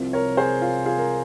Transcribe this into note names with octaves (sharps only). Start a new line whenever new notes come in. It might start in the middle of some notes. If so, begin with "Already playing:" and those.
Already playing: C2 C3 F3 C4
A#4 C#5
G#4 C5
F4
F4 G#4
A#4